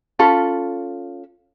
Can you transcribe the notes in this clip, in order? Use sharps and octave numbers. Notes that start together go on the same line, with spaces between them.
C#4 F4 A4 B5